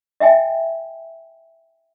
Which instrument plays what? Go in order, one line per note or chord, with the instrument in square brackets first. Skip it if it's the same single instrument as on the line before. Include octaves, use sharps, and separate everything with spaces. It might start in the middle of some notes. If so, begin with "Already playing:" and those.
[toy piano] D#5 E5 G5 G#5